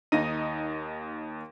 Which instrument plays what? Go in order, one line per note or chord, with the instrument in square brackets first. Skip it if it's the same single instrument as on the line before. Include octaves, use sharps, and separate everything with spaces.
[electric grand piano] D#2 A#6 D#7 [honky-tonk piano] D#4